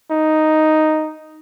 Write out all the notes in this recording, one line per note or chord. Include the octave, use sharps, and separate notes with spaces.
D#4